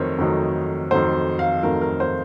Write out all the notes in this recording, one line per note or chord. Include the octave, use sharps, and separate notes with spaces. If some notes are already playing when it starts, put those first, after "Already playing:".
Already playing: F2 D#3 F#3 A3 A#4 C5 C#5
F2 D#3 F#3 A3
F2 D#3 F#3 A3 C5
F5
F2 D#3 F#3 A3 A#4
A#4
C5